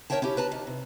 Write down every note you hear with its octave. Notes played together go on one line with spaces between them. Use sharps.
A#4 C5 C#5 E5 G5 A5
C#4 E4 G4
B4 A5 A#5
D#3
C3